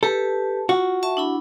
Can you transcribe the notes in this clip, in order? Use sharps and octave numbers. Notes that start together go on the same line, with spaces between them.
G4 A4 B4
F4 F#4
E5 A5 C#6
D4 E4 B5